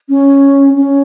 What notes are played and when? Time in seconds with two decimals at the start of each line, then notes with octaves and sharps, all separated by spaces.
0.09 C#4
0.76 C#4